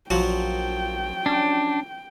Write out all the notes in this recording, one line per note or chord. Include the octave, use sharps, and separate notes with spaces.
A#1 F3 F#3 F#4 G5
C#4 D4